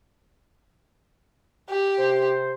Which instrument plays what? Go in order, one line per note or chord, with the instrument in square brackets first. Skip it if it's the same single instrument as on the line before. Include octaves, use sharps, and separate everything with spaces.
[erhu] G4
[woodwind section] C3 C5